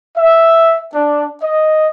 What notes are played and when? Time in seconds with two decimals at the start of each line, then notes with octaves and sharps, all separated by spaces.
0.18 E5
0.94 D4
1.42 D#5